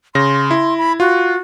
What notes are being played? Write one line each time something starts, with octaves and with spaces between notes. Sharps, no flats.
C#3 C6 A#6
E4
B5
F4 F#4